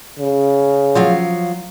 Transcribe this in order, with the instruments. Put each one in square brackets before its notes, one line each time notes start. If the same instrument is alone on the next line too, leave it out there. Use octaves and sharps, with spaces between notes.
[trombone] C#3
[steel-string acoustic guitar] F3 F#3 F5